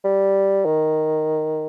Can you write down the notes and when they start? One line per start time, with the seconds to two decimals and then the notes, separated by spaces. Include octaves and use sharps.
0.04 G3
0.65 D#3